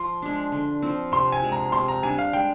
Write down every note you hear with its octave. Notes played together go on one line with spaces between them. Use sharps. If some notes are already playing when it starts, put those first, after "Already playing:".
Already playing: F3 C6
G#3 D4
D3
F3 C4
C3 C6
G#5
F3 G#3
A#5
C3 C6
A#5
G3 D4 G#5
F5
G#3 G5